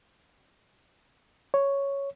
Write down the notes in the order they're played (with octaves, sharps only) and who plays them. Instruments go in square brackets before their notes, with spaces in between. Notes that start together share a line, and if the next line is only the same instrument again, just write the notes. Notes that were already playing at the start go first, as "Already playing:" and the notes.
[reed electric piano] C#5